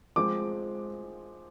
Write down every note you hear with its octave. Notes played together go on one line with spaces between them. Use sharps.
F3 G#3 C4 D6